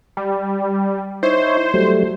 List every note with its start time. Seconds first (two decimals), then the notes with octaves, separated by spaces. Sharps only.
0.17 G3
1.23 D#4 E4 C5 C#5
1.74 F#3 G3 A3